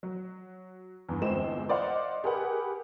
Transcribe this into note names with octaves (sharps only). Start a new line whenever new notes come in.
F#3
E2 G2
G1 E2 F3 G#3 C4 E7
C5 D5 D#5 F5 F#5 C6
G4 G#4 A#4 B4 F#5